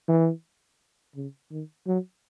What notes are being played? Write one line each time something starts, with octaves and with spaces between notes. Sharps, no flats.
E3
C#3
D#3
F#3